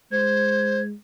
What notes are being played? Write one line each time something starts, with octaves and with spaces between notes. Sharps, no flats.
G#3 C5 G#6